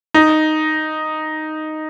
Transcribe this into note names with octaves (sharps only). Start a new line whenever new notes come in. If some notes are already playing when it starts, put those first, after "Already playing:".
D#4